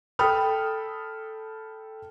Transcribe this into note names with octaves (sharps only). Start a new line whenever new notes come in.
A4 G5 B5 D#6 F6